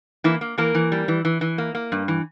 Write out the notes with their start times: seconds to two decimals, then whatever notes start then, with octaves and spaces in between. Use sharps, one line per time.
0.24 E3 A#3 E4
0.41 A#3
0.58 E3 A#3 A#4
0.75 E3
0.92 G3
1.08 E3
1.25 E3
1.41 E3
1.58 A#3
1.75 A#3
1.92 G2
2.08 E3